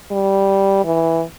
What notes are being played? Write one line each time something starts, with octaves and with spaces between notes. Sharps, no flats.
G3
E3